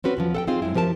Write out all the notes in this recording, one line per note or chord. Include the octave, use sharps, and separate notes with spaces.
C4 C#4 F#4 B4
E2 D#3 F3
A4 F#5 G5
C4 D#4 F4 G#4
F#2 B2 G#3 E4
F3 G4 A#4 A5